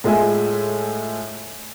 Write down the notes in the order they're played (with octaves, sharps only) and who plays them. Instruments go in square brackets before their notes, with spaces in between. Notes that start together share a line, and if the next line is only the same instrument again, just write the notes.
[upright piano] A2 G#3 F4 E5 G#5